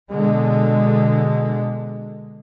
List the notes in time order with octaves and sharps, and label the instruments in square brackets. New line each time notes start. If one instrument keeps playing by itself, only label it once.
[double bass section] B2 D3 G#3